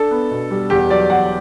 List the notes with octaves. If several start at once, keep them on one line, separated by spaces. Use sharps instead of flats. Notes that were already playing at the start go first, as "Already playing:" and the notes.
Already playing: D4 A4
B3
B2
G3
E2 G4
F#3 D5
E2 F#5